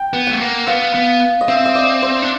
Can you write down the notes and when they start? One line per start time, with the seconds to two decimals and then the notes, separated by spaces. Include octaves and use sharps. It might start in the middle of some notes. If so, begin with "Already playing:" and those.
Already playing: G5
0.14 B3
0.27 A3 F#5
0.40 A#3
0.67 B3 F5
0.95 B3
1.41 D#5
1.48 C4 E5
1.65 D#5
1.75 D5
2.02 C5
2.22 D4